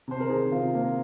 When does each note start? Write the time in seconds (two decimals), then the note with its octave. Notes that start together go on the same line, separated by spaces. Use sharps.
0.08 C3 C5
0.20 A#4
0.30 D#3 G#4
0.52 C3 F4
0.74 A#3